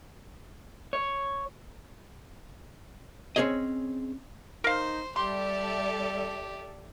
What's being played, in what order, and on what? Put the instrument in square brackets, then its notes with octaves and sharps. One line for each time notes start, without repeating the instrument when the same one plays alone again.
[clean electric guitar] C#5
[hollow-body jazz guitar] C4 C#4 G#4 C#5 D#5
[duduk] D#4 [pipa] A#4 F5 [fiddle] C5
[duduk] G3 [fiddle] G4 [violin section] A4 D5 E5 [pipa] C6